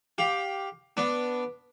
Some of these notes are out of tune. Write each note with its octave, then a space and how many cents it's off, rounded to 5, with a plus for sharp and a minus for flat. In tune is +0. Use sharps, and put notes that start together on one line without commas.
G4 +0 F5 +20
B3 +0 D4 +0